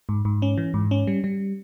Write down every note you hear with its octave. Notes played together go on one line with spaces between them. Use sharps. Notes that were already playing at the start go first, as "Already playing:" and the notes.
G#2
G#2
C#4
E3
G#2
C#4
G3
G3